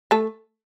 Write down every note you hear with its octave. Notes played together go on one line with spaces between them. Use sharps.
A3 A4